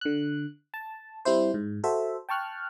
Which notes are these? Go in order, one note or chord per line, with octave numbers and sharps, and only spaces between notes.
D3 F#6
A5
G3 C4 E4 C5
G#2
F#4 A4 C5 E5
G5 A5 C#6 F6 F#6